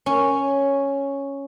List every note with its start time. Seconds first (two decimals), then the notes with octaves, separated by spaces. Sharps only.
0.06 C#4